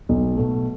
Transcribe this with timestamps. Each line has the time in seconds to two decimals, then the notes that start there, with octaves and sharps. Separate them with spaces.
0.09 B1
0.37 B2 A3